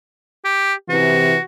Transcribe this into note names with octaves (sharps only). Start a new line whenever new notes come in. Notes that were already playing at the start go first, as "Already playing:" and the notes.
G4
C3 E3 F#4